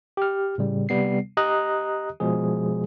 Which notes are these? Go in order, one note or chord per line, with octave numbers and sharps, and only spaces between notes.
G4 F6
A2 C#3 G3
C3 G3 B3 C7
G4 D#5 A#5 D#6 F#6
B2 F3 G#3 G#4